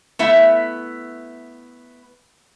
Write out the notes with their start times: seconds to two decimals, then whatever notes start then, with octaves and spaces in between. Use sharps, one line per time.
0.19 A3 B3 E4 E5